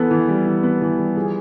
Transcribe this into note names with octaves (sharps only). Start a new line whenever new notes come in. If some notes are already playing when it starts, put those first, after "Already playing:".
Already playing: E3 B3 A4
E3
G3
E3
B3
E3
G3
F3 G#4